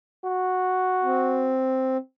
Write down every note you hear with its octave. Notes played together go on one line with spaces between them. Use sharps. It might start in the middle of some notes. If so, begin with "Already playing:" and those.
F#4
C4